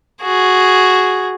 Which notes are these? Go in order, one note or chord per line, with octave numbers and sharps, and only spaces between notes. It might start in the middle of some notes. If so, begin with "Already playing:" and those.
F#4 G#4